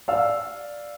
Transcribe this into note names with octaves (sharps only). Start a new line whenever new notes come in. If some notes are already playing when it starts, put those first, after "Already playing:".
D5 F5 E6